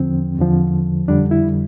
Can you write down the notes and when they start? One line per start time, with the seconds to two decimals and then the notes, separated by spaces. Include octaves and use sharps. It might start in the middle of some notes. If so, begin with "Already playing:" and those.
Already playing: E2 D3 F3 C4
0.38 E2 D3 F3
1.08 F2 D3 G3 D4
1.31 E4